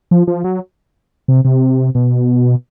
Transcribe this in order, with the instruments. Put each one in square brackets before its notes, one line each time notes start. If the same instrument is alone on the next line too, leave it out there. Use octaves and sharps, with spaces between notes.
[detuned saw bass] F3
F3
F#3
C3
C3
B2